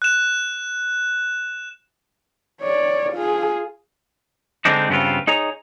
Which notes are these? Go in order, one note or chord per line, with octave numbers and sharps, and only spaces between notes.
F#6 E7
C#5 D5
F4 G#4
D3 G#3 C4 D4 D#4
G2 C#3 B3 C4 F4
D#4 G#4 C#5 A#5